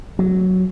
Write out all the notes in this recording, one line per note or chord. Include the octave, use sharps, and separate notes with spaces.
F#3